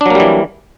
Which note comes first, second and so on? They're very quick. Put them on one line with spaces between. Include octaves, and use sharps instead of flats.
D4 F#3 A#3 G3 E3